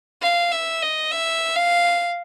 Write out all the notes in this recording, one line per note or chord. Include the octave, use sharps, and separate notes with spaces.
F5
E5
D#5
E5
F5